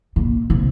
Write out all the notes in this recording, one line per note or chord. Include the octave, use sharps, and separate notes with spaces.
A#2
C3